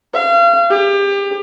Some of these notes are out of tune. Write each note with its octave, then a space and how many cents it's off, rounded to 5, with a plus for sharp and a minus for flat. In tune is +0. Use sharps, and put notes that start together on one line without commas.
F5 -35
G4 +30